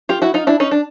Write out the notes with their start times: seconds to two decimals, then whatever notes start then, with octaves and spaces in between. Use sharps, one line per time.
0.09 F4 G4
0.22 E4 F#4
0.34 D#4 F4
0.47 D4 E4
0.60 C#4 D#4
0.71 D4